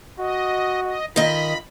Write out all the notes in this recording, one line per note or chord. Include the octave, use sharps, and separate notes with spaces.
F#4 D#5
D#5
D#3 F4 D#5 B5